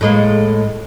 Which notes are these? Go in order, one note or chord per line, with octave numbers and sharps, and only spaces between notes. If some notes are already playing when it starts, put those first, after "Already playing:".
A2 G#3 A#3